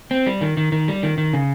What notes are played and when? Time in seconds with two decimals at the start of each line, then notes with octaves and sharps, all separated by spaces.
0.11 C4
0.27 G3
0.41 D#3
0.57 D#3
0.72 D#3
0.88 G3
1.03 D#3
1.18 D#3
1.33 C#3